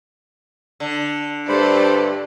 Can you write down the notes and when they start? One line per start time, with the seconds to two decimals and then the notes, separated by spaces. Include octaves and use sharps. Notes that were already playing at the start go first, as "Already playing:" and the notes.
0.80 D3
1.49 G2 A3 A4 C5 D5 B5